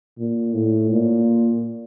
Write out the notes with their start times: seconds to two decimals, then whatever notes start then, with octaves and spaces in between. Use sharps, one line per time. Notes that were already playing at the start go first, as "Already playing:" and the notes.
0.19 A#2
0.53 A2
0.91 A#2